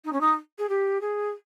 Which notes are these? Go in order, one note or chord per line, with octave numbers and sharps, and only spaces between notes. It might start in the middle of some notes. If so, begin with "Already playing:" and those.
D#4
C#4
D#4
G#4
G4
G#4